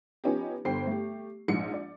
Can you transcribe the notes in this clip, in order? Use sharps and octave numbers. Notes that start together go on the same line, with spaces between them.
F3 B3 C#4 D#4 G4
G1 G3 C5 G5 C7
A3 G4
A#1 G#2 C#7
D5